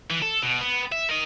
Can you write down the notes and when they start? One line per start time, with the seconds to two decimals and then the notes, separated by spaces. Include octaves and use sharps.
0.10 E3
0.22 A4
0.43 B2
0.61 B3
0.92 E5
1.09 A#4 D#5